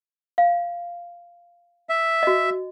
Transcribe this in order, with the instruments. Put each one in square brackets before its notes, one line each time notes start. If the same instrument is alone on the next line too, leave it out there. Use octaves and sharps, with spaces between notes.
[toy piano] F5
[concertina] E5
[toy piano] F#4 D#5